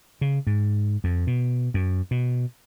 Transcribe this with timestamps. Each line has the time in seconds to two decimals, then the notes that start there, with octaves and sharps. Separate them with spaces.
0.21 C#3
0.47 G#2
1.04 F2
1.27 B2
1.74 F#2
2.11 B2